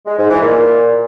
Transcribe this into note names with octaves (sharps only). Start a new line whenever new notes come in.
G#3
G#2
E3
A#2